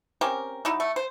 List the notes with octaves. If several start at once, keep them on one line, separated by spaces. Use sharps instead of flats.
C4 C#4 G4 A#4
F#3 D#4 E4
A3
C5